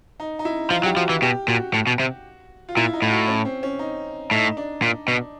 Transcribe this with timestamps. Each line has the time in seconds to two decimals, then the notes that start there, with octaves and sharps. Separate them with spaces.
0.20 D#4
0.39 D#4
0.45 E4
0.71 F3 F4
0.84 F#3 G4
0.96 F3 F#4
1.10 E3
1.22 B2 G4
1.48 A#2 F#4
1.74 A2
1.87 B2
2.00 C3
2.69 F4
2.77 A#2 E4
2.93 D#4
3.02 A2 F4
3.11 F#4
3.28 C#4
3.45 C4
3.63 C#4
3.79 D#4
4.31 A2 D#4
4.57 D4
4.82 A#2
5.08 B2